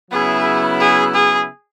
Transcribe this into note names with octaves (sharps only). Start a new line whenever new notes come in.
C#3 F#3 B3 E4 G#4
G#4
G#4